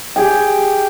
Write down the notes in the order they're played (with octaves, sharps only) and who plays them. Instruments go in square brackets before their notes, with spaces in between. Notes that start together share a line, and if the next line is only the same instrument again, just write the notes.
[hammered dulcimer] G4 G#4 G5